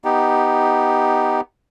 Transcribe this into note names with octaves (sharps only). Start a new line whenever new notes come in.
B3 D#4 G4